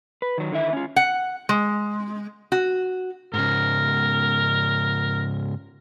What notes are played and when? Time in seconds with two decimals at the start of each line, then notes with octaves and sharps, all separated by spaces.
0.22 B4
0.38 D#3 F#3
0.52 D3 D#3 E4 E5
0.73 C#4 F4
0.96 F#5
1.49 G#3
2.52 F#4
3.34 G#2 C#3 A#4